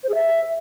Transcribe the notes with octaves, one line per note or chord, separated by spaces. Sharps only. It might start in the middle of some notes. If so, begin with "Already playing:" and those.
C5
G#4
E5